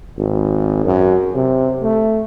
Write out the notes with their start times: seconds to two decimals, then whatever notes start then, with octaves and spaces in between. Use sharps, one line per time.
0.18 G#1
0.85 F#2
1.34 C3
1.82 A3